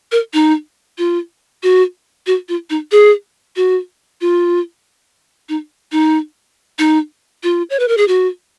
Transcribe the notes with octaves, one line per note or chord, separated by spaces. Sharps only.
A#4
D#4
F4
F#4
F#4
F4
D#4
G#4
F#4
F4
D#4
D#4
D#4
F4
C#5
B4
A#4
G#4
F#4